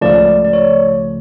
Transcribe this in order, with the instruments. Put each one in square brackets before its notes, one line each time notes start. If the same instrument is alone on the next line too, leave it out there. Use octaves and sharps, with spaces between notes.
[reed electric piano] C#2 C#3 F3 A3 [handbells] D5
[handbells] D5
C#5